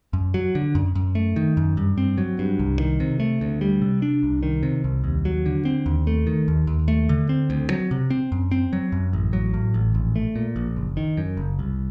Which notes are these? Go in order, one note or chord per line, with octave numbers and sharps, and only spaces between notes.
F#2
F#3
D3
F#2
F#2
A3
D#3
F#2
G2
C4
F#3
G2
C2
D#3
C3
A3
D2
G3
C3
D4
C2
D#3
C3
C2
D#2
F#3
D3
C4
D#2
A3
D#3
D#2
D#2
A3
D3
C4
D2
F#3
C3
C4
F#2
C4
F#3
F#2
A1
F#3
A2
A1
A#1
A3
A#2
A#1
F#1
D#3
F#2
F#1
C2